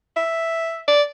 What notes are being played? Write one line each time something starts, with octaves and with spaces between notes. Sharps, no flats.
E5
D5